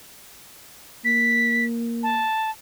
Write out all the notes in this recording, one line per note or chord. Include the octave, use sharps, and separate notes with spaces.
A#3 B6
A5